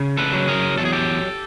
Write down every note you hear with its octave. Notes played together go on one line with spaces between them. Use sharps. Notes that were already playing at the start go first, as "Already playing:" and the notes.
Already playing: C#3
A4 B4
F#3
G#4 A#4
E2 A4
G#4
G4 A4